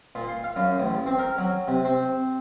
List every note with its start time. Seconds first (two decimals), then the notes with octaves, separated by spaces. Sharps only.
0.15 A#2
0.29 C6
0.44 F5
0.56 F#2
0.79 A1
1.06 C4
1.19 A#4
1.38 F#3
1.68 C3
1.85 C4